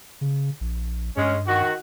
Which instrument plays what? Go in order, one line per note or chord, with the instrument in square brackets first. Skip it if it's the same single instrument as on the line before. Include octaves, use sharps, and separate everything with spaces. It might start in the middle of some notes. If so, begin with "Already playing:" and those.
[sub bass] C#3
A#1
[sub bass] G2 [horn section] G#3 C#4
[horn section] D#3 F#4